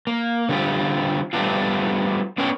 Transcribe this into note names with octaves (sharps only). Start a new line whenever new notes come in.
A#3
D3 G3 A3 C4 F4 G4
G3 A3 B3 C4 D4 F4
B3 C#4 D4 A#4 C#5 G5